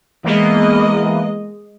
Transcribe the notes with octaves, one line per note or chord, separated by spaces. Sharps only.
E3 G#3 A#3 B3 D#5